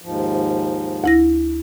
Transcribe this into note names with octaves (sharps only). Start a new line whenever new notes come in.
D#2 G#2 F3
D2 E4 A#6